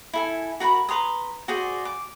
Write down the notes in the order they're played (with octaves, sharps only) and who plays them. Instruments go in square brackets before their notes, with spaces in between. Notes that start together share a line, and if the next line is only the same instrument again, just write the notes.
[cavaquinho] E4 A4 G#5
F#4 A#4 A#5 B5
B4 A#5 C6 D#6
F#4 G#4 C5 D5
D6